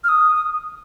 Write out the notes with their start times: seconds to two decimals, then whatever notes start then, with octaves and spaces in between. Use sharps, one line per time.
0.04 F6
0.09 D#6
0.35 D#6